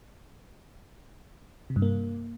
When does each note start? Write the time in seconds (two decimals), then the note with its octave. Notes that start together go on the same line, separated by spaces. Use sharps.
1.70 C3
1.76 G2
1.82 A#3